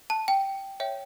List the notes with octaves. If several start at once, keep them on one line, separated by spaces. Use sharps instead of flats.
A5
G5
C#5 E5 G5